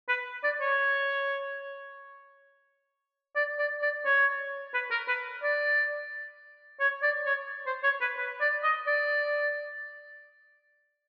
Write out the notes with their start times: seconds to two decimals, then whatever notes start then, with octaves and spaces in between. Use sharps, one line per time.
0.09 B4
0.44 D5
0.61 C#5
3.36 D5
3.59 D5
3.82 D5
4.05 C#5
4.74 B4
4.91 A#4
5.08 B4
5.43 D5
6.80 C#5
7.03 D5
7.26 C#5
7.67 C5
7.84 C#5
8.01 B4
8.18 B4
8.41 D5
8.63 D#5
8.87 D5